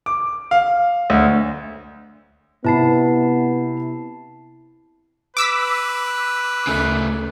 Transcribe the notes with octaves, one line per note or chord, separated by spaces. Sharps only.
D6
F5
D2
C3 B3 E4 A5 B5 C7
B4 D6 E6 B6
D2 C#3 A3 A#4